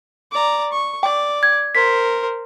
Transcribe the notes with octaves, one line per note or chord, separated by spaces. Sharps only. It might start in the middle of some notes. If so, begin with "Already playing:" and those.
D5 A#5
C#6
D5 G5
G#6
A#4 C5 B6